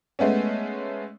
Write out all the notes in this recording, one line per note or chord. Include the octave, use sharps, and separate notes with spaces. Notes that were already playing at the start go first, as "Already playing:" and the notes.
G#3 A3 B3 C#4